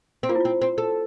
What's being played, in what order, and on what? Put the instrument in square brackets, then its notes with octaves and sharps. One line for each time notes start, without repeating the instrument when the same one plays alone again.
[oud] C4
[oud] A#3 [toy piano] F4
[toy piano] E4
[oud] C4 [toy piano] F4
[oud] C4
A4